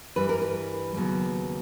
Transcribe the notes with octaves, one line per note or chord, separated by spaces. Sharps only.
G2 E3 G3 B4
A#4
B4
D#2 C#3 F#3 B3